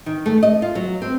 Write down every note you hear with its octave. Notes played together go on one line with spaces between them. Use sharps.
D#3
A3
D#5
F4
F#3
C4